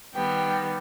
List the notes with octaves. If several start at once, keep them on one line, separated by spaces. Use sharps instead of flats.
D#3 G3 B3 G5